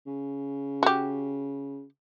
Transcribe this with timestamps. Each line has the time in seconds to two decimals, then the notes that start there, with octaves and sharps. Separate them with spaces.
0.06 C#3
0.83 F#4 G4